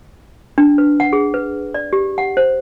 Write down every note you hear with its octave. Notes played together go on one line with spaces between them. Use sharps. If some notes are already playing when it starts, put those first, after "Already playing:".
D4
B4
F#5
G#4
B4
D5
G4
F#5
C5